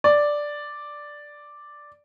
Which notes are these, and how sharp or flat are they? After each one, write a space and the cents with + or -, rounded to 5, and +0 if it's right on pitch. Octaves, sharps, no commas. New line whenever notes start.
D5 +0